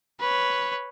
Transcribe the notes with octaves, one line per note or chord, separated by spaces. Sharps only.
B4 C#5